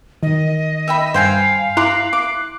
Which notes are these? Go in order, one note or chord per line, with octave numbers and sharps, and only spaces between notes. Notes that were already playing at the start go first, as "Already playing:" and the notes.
D#3 D#5
E5 G5 B5
G2 C5 F5 G5 G#5
E4 A#5 C6 D6 F#6
D6